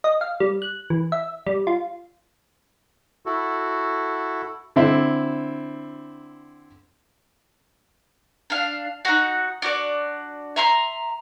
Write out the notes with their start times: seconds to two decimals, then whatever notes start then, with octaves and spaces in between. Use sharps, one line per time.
0.04 D#5
0.21 F5
0.40 G3
0.62 F#6
0.90 E3
1.12 E5
1.46 G3
1.67 F4
3.26 E4 F#4 A4
4.76 D3 C4 E4
8.50 D4 F5
9.05 D#4 F#4
9.62 D4 F#4 D5
10.56 E5 A#5 C6